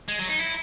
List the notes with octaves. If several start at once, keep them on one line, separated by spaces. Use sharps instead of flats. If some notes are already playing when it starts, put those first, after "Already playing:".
G#3
F#3
D#4
E4